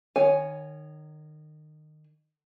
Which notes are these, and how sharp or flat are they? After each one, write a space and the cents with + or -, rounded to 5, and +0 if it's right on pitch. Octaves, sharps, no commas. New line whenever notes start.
D#3 -25 C#5 +0 G#5 +0